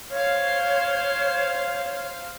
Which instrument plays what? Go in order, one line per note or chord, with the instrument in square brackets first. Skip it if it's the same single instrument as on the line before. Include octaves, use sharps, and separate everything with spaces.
[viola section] C5 F5 [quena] C#5